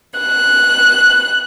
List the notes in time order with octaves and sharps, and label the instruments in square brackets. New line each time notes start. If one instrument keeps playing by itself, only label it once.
[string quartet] F#6